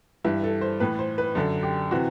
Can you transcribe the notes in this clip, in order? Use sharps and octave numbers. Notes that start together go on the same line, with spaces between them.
G2 E3 E4
A4
C5
A2 E3 B4
C5
B4
F#2 D3 A4
G4
C3 E3 F#4